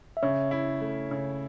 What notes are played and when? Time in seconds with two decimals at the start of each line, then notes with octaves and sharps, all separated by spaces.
0.17 E5
0.23 C#3 C#5
0.51 E4
0.81 A3
1.11 C#3